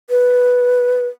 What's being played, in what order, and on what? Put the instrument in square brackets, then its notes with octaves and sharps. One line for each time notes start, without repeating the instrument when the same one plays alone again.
[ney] B4